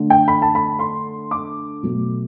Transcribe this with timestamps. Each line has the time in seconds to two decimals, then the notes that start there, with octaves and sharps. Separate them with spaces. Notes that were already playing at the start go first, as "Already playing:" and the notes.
Already playing: D3 A3
0.10 G5
0.28 B5
0.42 A5
0.55 B5
0.79 C6
1.31 D6
1.83 B2 F#3 A3